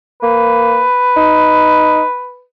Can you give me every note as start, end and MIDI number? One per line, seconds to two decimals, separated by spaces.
0.23 0.83 58
0.23 2.43 71
1.17 2.01 63